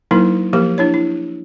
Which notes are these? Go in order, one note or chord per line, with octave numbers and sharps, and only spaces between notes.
F#3 A#3 D#4 E4 A#4
F3 A#3 G4 A#4
D4 E4 C#5
E4